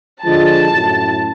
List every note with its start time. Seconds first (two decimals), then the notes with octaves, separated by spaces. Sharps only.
0.24 D3 F3 G#3 A5
0.71 F#2 A2